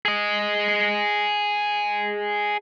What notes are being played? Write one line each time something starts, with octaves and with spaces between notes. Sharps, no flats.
G#4 D#5